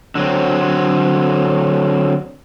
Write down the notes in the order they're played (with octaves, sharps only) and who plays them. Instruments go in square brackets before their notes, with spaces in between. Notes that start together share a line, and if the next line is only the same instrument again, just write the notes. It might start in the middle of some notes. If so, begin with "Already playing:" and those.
[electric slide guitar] D3 F#3 C4